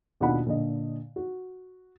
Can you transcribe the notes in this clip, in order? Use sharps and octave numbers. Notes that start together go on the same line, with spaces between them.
D#2 B2 D4 F4 F#5 B5
A#2 D3 D#5
F#4